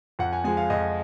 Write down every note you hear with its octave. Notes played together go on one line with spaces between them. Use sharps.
F2 F#5
G#5
F3 G#3 G#5
F5
F2 D#5